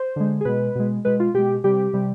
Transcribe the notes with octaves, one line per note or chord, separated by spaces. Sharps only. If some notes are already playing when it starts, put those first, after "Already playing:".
Already playing: C5
D3 G#3
G#4
B2 G#3 B4
B2 G#3
B2 G#3 B4
F4
B2 G#3 G4
C3 G3 G4
C3 G3